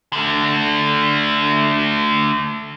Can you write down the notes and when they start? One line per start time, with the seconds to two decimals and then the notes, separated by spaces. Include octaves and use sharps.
0.13 D3 A3